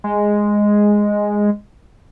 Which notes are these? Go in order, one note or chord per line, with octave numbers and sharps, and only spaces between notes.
G#3